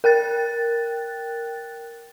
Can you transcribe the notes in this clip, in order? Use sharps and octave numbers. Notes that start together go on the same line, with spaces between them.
A#4 G5 F#6 A6